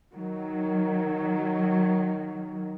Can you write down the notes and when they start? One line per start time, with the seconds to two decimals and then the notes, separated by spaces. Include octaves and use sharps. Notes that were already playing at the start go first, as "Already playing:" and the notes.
0.13 D#3 F#3